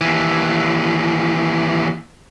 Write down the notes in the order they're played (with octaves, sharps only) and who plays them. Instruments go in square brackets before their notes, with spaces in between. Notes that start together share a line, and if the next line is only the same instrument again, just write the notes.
[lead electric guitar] D#2 E3